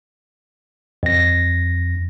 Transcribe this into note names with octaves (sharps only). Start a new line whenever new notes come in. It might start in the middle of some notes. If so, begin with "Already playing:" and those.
F2 A#6